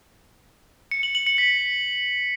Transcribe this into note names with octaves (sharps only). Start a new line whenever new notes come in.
C#7
F#7
F#7
C#7
B6